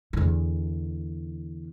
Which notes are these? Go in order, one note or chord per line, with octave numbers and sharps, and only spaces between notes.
E2 D3